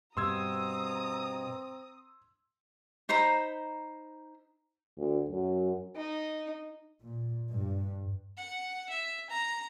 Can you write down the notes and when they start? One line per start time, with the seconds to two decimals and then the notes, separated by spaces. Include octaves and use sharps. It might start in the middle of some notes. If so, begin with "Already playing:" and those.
0.17 G2 B2 C4 A#5 C6 D#6 E6 G#6
3.09 D#4 C5 A#5 B5
4.98 D2
5.30 F#2
5.96 D#4
7.01 A#2
7.53 G2
8.37 F#5
8.90 E5
9.30 A#5